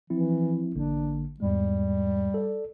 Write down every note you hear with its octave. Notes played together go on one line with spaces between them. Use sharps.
E3 F3 C4 E4
A1 D3 A#3 D4
E2 G#2 G3 G#3
A4 D5